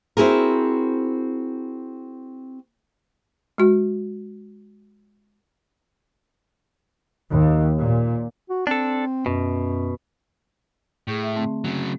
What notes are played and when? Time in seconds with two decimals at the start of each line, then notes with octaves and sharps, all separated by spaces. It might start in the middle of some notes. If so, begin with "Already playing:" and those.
0.17 C4 E4 F#4 G#4 A#4
3.58 G#3 F#4
7.30 D#2
7.78 A#2
8.50 F#4
8.67 C4 D4 A4
9.26 F#2 B2
11.08 A2 G#4 C#6 G6
11.23 E5
11.36 D3 A3 C4
11.64 C#3 F#3